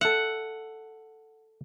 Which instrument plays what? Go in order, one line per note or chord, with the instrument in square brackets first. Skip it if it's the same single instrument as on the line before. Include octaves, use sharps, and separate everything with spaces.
[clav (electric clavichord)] A4 E5 [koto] F#5